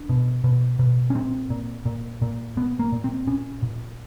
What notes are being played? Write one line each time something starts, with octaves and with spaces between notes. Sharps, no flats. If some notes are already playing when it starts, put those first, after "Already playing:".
Already playing: D4
B2
B2
B2
C#4
A#2 C4
A#2
A#2
A#2
A#2 B3
A#3
A#2
C4
A#2 C#4
A#2